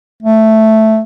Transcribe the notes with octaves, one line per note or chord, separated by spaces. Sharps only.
A3